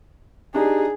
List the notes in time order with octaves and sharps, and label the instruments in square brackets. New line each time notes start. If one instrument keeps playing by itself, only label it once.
[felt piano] D4 D#4 [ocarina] G4 [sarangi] G#4